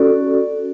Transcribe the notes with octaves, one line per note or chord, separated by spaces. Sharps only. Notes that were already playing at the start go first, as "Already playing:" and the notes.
Already playing: C#4 F#4 A4 D5